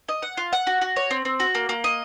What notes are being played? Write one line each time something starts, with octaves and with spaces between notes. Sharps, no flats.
D#5
F#5
F4
F#5
F#4
F#4
C#5
C4
C4
F#4
A#3
A#3
D#5